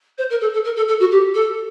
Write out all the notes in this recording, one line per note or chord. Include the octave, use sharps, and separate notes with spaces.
C5
A#4
A4
A4
A#4
A4
A4
F#4
G4
A4